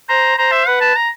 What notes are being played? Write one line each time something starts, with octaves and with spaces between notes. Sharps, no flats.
C5 A#5
C5 A#5
E5
B4 F#5
A5
A#5